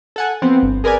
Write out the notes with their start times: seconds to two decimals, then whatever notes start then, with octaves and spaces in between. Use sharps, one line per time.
0.16 A4 F#5 G#5
0.42 F3 B3 C4
0.63 G1
0.84 G#4 A#4 B4 D5 G#5